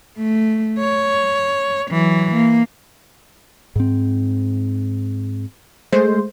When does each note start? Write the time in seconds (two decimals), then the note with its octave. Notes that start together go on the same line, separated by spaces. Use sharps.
0.18 A3
0.80 C#5
1.91 E3 F#3
2.34 A#3
3.76 G#2 C4
5.92 G#3 A3 C5